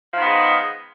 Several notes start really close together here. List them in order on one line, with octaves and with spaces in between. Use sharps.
F3 D#3 B3 G#3